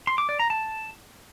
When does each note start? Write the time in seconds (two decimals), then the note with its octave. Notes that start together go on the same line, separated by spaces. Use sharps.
0.07 C6
0.18 D6
0.29 D5
0.39 A#5
0.50 A5